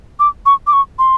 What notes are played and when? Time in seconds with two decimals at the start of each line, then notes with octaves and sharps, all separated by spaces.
0.19 D6
0.46 C#6
0.67 D6
0.73 C#6
0.99 C6